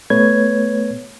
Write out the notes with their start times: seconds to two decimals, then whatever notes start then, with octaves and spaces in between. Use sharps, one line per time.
0.10 A3 B3 B4 C#5 G#6